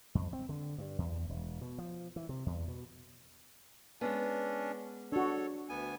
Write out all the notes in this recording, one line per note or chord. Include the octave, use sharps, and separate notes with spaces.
F2
C4
D3
G2
E2
E1
B2
F3
E3
C3
E2
B2
G#3 B3 C#4 D4
D4 F#4 A4 C#5
D2 B3 G#5